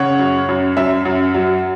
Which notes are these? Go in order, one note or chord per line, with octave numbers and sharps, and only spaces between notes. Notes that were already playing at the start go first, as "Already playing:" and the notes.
Already playing: C#3 C#5 F#5
F#2
F#2
F#2 E5
F#2
F#3